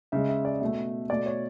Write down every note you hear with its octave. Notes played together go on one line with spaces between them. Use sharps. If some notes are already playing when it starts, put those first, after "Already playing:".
C#3 G#3 E5
E5
D5
B2 A3 E5
B2 A3 D5
C#5